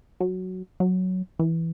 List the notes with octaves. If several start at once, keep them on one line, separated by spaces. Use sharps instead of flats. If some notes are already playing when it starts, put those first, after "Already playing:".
F#3
F#3
E3